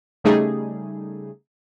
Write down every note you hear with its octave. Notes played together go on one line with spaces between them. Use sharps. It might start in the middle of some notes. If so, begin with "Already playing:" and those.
C#3 G3 A3 D#4 G#4